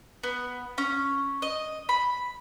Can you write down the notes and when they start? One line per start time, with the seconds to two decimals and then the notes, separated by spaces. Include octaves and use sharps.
0.24 B3
0.78 C#4
1.42 D#5
1.89 B5